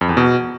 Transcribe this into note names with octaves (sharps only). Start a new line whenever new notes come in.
F2
E2
B2